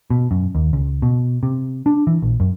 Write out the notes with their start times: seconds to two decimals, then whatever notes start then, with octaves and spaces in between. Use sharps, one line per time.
0.10 B2
0.31 F#2
0.55 D#2
0.73 C#2
1.02 B2
1.43 C3
1.86 D4
2.07 E3
2.22 A#1
2.40 F#2